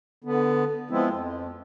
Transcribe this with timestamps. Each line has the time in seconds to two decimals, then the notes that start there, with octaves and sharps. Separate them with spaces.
0.24 D3 B3
0.91 F3 G#3 B3 C4 E4
1.09 F2